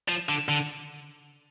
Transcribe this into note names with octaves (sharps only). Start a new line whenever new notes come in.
F3
D3
D3